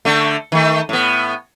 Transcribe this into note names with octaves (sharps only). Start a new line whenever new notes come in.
D3 A3
D#3 A3
A2 B3